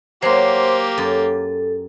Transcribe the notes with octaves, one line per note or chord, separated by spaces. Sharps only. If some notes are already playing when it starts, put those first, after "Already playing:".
F#3 A#3 G4 C5 C6
F#2 A4